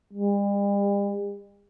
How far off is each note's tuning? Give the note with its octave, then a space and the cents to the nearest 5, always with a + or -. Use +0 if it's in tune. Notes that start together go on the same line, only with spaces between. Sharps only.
G3 +45